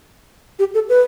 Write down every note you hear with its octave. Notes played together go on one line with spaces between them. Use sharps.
G4
A4
B4